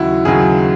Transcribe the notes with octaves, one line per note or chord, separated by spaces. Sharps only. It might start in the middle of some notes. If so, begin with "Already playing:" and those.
Already playing: D#2 C#3 F#3 E4 F#4
D#2 C#3 F#3 G#4